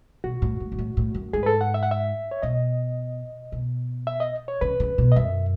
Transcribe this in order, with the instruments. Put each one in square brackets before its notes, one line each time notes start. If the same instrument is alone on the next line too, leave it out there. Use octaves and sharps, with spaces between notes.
[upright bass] B2 [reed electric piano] F#4
[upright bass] A2
G#2
G#2
A2
A2
F#2
[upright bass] G#2 [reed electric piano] G#4
[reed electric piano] B4
A4
F#5
E5
F#5
E5
C#5
[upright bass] B2 [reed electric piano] D#5
[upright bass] B2
[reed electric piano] E5
D#5
C#5
[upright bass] C#3 [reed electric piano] B4
[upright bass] C#3
B2
[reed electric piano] D#5
[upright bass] F#2 [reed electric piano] E5